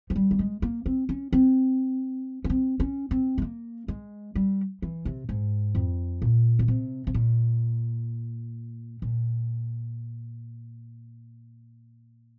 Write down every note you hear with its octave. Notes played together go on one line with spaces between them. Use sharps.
F3
G3
A#3
G#3
A#3
C4
C#4
C4
C#4
C4
C#4
C4
G#3
A#3
G#3
G3
E3
C3
G#2
F2
A#2
C#3
C3
C3
A#2
A#2